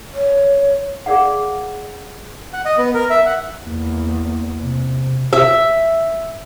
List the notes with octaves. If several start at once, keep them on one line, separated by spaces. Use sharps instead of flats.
C#5
G#4 A#4 D5 F5 F#5
F#5
D#5
B3
A#4
E5
F#5
E2 A#3
C3
E5